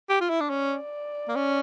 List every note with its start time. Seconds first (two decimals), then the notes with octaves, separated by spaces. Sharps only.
0.10 G4
0.21 F4
0.30 E4
0.40 D4
0.50 C#4 D5
1.28 A#3
1.36 C#4